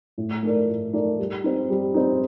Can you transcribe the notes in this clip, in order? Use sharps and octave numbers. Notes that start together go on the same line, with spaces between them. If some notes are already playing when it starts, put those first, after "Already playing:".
A2
A3 D#4 A#4 D5
A2
A3 D#4 A#4 D5
G3
C4 D#4
G3
C4 D#4